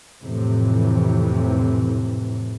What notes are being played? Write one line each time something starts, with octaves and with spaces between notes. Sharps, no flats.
F2 A2 C3 E3